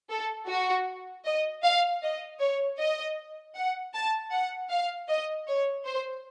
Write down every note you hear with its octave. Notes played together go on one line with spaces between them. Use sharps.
A4
F#4
D#5
F5
D#5
C#5
D#5
F#5
A5
F#5
F5
D#5
C#5
C5